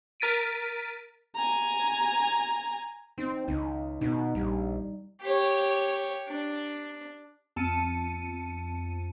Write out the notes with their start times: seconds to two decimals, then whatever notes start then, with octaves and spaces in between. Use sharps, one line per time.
0.20 A#4 A6 B6 D7 D#7
1.35 G#5 A#5
3.18 C4 D#4
3.48 C#2 D#4
4.01 B2 D#4
4.35 A#1 G3
5.22 G4 C#5
6.29 D4
7.56 F2 A5 C#7 D#7